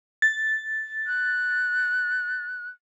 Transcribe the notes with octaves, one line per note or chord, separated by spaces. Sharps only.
A6
F#6